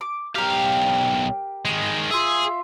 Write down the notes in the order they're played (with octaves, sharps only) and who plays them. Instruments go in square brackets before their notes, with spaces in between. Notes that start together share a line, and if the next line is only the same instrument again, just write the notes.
[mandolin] D6
[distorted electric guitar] B1 F5 [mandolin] G4 A#4
[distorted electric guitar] D#3 G#3
[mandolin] F4 E5 [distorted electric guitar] G#4